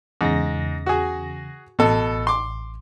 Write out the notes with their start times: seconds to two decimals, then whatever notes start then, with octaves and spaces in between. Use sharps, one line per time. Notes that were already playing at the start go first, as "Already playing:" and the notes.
0.21 E2 G#2 C#3 A#6
0.86 F#4 G#4
1.79 A1 B2 A4
2.27 C6 D6